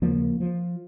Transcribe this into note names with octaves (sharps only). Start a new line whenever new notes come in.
D#2 C#3 F3 A#3
F3